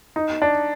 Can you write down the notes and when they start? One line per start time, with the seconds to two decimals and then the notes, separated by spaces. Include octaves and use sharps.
0.16 D#4
0.42 D4